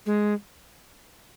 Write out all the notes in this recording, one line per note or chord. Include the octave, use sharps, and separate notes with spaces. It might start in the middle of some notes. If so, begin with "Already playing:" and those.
G#3